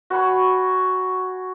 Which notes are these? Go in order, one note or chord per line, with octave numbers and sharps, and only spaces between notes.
F#4 C#5 G#5 B5